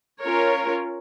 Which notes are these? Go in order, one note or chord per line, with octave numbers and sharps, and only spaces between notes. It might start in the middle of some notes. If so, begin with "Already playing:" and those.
C#4 F4 A#4 C#5